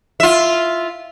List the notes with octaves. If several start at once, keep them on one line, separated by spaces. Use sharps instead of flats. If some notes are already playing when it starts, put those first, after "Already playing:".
F4 E5